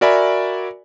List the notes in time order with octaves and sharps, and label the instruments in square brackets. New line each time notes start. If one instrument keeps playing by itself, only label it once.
[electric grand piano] F#4 A#4 D5 E5 G#5 B5